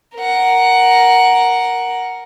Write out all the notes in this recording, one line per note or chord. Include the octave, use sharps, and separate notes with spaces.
A#4 F#5